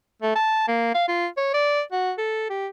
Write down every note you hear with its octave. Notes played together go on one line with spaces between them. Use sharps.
A3
A5
A#3
F5
F4
C#5
D5
F#4
A4
G4